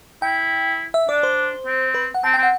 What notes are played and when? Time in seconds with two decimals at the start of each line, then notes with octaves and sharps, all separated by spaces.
0.22 E4 G5
0.94 E5
1.08 D4 D5
1.23 C5
1.67 C4
1.94 B4
2.15 F#5
2.24 C4 A5
2.34 G5
2.38 C4
2.43 F#5